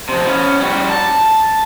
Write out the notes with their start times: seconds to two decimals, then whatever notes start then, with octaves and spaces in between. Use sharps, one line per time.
0.09 C3 F3
0.25 B3 C#4
0.61 G3 F#4
0.89 A5